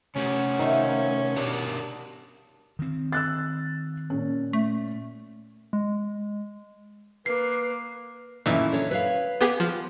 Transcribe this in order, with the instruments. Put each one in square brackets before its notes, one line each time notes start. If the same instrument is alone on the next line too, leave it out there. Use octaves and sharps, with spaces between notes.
[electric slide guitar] C3 A3 G4 [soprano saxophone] C#4
[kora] D#3 [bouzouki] C5 E5 F5
[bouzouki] B2 F#4 D5 [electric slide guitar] D4 G4 A#4
[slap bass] D#3 C4
[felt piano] E6 F#6 A6
A#2 C#4
[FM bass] A3
[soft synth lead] G#3
[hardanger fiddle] A#3 [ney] B4 [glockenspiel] C7
[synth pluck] A#2 D#3 E3 [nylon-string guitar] A3 C#4 E4
[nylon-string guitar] D3 A4 C#5
B4 C#5 F5
[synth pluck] B3 G4 G#4
F3